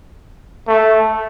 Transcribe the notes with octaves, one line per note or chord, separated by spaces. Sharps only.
A3